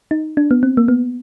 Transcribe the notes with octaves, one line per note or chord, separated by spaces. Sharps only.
D#4
D4
B3
C4
A#3
B3